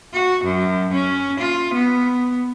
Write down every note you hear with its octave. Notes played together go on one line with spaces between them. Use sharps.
F#4
F#2
C#4
F4
B3